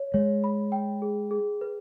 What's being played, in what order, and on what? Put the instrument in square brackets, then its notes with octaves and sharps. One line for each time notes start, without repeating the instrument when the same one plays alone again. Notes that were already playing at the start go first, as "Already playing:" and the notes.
Already playing: [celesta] C#5
[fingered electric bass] G#3 [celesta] C#5
[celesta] B5
G5
G#4
G#4
B4